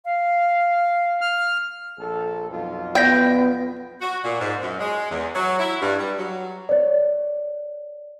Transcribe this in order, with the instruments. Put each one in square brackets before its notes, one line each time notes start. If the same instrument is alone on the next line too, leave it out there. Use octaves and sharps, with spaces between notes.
[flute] F5
[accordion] F6
[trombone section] A#1 A4
B1 F2 F4
[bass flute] B3 [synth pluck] D5 G6 A#6 [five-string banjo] G5
[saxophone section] F#4
A#2
G#2
F#2
G#3
E2
F#3
E4
G2
G3
F#3
[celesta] C#5 D5